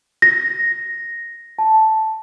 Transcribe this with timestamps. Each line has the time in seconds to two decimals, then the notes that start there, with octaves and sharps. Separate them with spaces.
0.22 A#6
1.59 A5